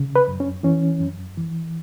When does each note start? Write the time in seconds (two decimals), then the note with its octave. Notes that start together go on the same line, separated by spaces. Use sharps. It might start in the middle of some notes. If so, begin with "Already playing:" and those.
Already playing: C#3
0.16 B4
0.28 F#2
0.40 C#4
0.63 E3 C#4
1.01 F#2
1.37 E3